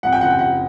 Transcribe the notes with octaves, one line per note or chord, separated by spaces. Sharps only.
F2 F#5
G5
F#1 F#5
G5
F#1 F#5